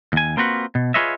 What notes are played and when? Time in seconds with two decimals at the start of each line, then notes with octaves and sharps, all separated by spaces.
0.13 D#2 G#5
0.37 A#3 C4 F4 F#4 B4
0.75 B2
0.94 F4 G#4 B4 C#5 D#5 E5